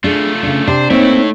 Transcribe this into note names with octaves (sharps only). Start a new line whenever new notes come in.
A3 D4 F4 G#4
C#3 D4
C3 D4 G4 C5
A3 A#3 C4 D#4 E4 C#5